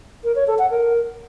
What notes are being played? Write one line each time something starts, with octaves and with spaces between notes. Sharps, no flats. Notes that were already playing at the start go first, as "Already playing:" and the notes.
A#4
C#5
A4
F#5
A#4